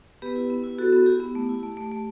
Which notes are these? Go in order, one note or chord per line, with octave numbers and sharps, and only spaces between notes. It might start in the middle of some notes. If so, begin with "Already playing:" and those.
B3 G4 B4
E4
B3
E4
B3 F#4 A4
B3
E4 G4
B3
A3
E4
A3
A3
A3